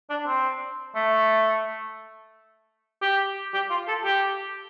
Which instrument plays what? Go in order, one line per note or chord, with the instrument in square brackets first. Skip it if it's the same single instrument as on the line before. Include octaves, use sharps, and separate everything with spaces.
[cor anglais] D4
C4
A3
G4
G4
F4
A4
G4